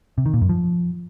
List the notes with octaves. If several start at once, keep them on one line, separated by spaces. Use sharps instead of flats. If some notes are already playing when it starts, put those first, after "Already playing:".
C3
D#3
A#2
F#2
F3